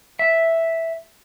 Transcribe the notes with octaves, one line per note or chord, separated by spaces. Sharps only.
E5